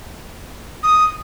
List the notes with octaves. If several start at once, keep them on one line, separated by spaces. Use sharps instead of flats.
D#6